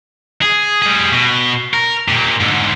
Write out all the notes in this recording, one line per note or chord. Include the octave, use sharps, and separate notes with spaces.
G#4
G3 G#4
B2
A#4
A#2 G4
G#2 D3